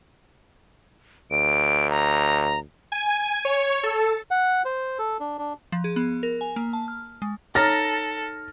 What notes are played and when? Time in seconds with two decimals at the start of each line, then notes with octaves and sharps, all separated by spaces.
1.31 D2 D7
1.90 A#5
2.92 G#5
3.45 C#5
3.83 A4
4.31 F#5
4.65 C5
4.99 A4
5.20 D4
5.38 D4
5.72 F3
5.84 G#4
5.96 B3
6.23 A#4
6.41 G#5
6.56 A#3
6.73 A5
6.88 F6
7.22 G#3
7.55 D#4 A4 C#5 A#5 F6 A6 A#6